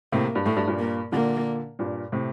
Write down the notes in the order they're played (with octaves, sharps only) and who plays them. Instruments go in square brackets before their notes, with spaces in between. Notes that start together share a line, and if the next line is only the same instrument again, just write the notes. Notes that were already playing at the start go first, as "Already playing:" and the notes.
[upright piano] A2 C3 [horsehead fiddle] A#3
[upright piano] G2
[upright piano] A2 [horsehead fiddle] A3
[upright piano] G2
G2 A#2
[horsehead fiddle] A#3
[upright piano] A#2 D3 [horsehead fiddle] A#3
[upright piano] G2 A#2
A2 C3